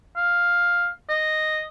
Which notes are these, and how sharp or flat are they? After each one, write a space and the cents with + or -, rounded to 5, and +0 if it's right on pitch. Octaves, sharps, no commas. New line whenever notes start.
F5 +5
D#5 -5